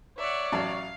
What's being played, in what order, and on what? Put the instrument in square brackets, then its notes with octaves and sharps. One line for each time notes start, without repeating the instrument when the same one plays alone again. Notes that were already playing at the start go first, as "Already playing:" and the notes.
[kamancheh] C#5 D5 [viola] E5 F#5
[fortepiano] A1 F#3 A5 [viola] F5